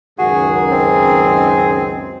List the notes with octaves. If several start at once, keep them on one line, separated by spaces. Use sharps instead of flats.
C#2 F#2 D#3 F#4 G#4
C4